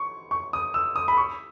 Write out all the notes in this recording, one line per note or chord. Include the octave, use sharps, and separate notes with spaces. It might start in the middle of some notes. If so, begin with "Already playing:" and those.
Already playing: C#6
C#6
D#6
E6
D#6
B5
C#6